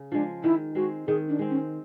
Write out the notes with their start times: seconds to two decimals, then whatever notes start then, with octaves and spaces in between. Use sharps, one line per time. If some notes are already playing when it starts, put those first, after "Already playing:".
Already playing: C#3
0.12 F3 G#3 D4
0.43 D#3 E4
0.75 G#3 C4 F#4
1.07 D#3 G#4
1.28 D4
1.39 G#3 C4
1.50 C#4